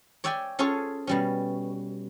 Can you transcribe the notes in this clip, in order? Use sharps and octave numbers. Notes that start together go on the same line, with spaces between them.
C#5 D5 E5 G5 G#5
C#4 F4 G#4 A4 C#5
B2 G3 C#4